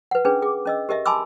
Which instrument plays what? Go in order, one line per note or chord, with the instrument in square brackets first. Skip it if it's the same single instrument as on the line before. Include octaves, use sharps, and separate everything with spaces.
[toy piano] B4 F#5
C#4 D4 G#4 B4
G#4 D6
C#4 D#5 E6
G4 A#4 D#5 E5
G#5 A5 B5 C6 D6 E6